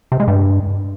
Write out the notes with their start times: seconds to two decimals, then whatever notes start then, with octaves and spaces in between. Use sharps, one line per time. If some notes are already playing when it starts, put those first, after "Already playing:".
0.12 C3
0.20 G#3
0.28 G2